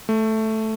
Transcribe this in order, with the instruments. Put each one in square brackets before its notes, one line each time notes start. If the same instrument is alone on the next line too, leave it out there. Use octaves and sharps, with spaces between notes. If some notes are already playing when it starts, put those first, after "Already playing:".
[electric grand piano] A3